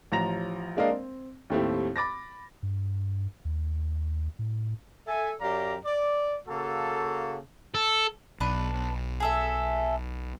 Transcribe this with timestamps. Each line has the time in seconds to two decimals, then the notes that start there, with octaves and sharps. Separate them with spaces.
0.12 A1 F3 A#5 A#6 F7
0.77 G#3 A#3 D4 A#4 D#5 F5
0.90 C4
1.50 D#2 A2 A3 C4 E4 G4
1.96 B5 D6 A6 A#6
2.63 G2
3.45 D#2
4.39 A2
5.07 A4 E5 G#5
5.41 F#2 G4 D5 F5 A#5
5.86 D5
6.48 C#3 A#3 F#4 A4
7.74 A4
8.40 B1 D4 B4
9.20 G#4 A4 E5